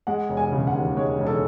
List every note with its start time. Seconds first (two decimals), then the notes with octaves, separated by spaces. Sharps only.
0.07 G#3 F#5
0.29 E1
0.37 G#5
0.52 C#3
0.67 F#5
0.74 D#2
0.97 G#3 C#5
1.19 E1
1.27 A4